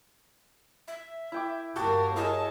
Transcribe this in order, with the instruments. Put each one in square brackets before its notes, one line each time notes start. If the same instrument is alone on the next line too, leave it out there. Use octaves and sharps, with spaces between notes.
[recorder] E5
[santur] E4 G5 D6
[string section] G1 A#3 A#4 [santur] F#4 G4 [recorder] A5
[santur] E4 G#4 A#4 [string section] C#5 A5 [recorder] D#5